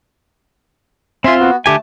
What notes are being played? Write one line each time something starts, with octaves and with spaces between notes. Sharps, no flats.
C4 F4 E5 G#5 C6
B3 F#4
D3 A3 G4 G#5 A5